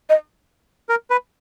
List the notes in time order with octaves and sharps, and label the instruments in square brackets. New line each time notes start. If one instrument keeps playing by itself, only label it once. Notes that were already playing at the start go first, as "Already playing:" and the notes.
[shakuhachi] D#5
[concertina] A#4
B4